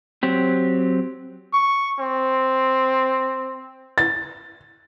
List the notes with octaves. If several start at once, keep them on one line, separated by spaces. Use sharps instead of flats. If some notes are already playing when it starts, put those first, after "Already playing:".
F#3 C4 G4
C#6
C4
A6